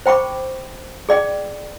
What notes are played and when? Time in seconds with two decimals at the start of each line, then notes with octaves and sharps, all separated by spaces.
0.06 C5 G5 B5 C#6 D6
1.09 G#4 D5 G5